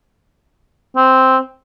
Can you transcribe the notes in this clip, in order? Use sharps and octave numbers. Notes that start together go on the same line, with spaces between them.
C4